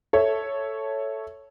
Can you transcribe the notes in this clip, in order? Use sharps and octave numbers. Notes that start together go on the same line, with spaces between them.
A4 C#5 E5